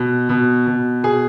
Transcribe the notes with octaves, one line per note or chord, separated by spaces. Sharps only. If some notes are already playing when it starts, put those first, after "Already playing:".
Already playing: B2
B2
B2
B2 G#4